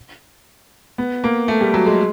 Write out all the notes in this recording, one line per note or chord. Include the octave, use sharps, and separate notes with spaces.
B3
A#3
A3
G3
F#3
G#3